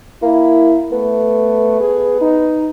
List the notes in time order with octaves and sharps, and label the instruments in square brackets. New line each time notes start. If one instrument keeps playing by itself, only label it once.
[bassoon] A#3 [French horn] E4
[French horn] A3 [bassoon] B3
[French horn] G#4
D#4